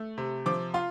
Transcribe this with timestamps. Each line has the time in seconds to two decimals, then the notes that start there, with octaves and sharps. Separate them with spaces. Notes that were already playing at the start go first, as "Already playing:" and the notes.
Already playing: A3
0.18 C3
0.46 F3 D6
0.74 F4 C6